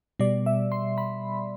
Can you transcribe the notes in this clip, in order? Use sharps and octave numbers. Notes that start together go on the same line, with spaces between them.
B2 G3 D5
E5
C6
B5